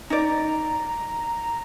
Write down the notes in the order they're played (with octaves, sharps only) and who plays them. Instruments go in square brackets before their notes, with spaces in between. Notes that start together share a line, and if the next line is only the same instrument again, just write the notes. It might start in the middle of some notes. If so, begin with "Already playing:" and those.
[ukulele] D#4 D5 [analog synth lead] A#5